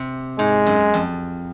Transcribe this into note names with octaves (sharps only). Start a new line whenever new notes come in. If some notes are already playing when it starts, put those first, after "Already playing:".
Already playing: C3
G#2 G#3
F#2
F2